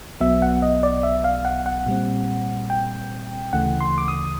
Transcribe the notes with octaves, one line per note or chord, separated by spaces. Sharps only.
B1 B2 F#3 B3 E5
F#5
D#5
D5
E5
F5
F#5
F#5
A#2 G3 C4
G5
D2 C#3 E3 A3 F#5
C6
D6
D#6